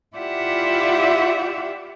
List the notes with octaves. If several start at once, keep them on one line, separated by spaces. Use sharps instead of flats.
E4 F4 G4 D5 E5 F#5